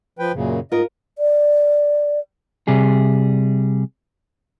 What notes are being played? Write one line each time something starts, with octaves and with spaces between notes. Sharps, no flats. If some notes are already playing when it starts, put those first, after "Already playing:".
F3 B4 G5
F#2 A#2 C#3
G#2 F4 A#4 D#5
D5
C3 G3 G#4